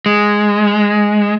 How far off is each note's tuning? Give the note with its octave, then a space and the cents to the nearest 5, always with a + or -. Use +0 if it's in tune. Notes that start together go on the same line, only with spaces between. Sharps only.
G#3 +0